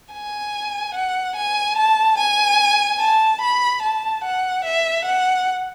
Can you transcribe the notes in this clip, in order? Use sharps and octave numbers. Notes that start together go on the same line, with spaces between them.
G#5
F#5
G#5
A5
G#5
A5
B5
A5
F#5
E5
F#5